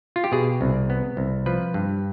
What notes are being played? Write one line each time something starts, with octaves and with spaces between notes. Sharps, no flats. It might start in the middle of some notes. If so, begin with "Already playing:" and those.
F4
G4
B2 G#4
C2
B3
C2
F3 B4
G2